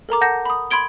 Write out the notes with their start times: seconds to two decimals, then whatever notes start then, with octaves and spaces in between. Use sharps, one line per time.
0.09 A4 A#4 A#5 D6
0.21 F#5 A5 G6 A#6
0.45 B5 D#6
0.71 B5 C6 G#6 D7 G7